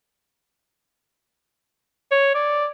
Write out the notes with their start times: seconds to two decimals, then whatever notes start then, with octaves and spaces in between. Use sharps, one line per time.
2.11 C#5
2.35 D5